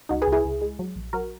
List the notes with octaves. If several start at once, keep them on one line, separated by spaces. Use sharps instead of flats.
C#2 D#4 F#4
G#4 B4
C#2
E4 G#4
C#2
G#3
F#3
A#1
F#3 F#4 A#4